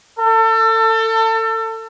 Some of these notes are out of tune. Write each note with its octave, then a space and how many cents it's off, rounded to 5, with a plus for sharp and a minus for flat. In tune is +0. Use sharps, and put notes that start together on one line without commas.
A4 +30